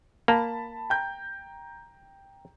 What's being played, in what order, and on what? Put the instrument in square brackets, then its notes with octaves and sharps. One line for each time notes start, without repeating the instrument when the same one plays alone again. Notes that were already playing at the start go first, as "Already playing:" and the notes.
[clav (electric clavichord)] A#3 [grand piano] A5 B5
[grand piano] G5 A#5 G6